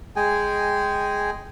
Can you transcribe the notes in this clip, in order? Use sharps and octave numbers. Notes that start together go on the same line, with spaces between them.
G#3 G#4 G5 G#5